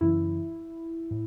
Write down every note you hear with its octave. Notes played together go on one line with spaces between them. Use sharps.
F#2 C#3 E3 E4
A2